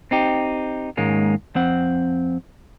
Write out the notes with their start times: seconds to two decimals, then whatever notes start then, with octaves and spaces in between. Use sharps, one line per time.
0.11 C4 D#4 G4
0.97 D#2 G#2 G#3 A#3 C#4
1.55 F2 C4 F#5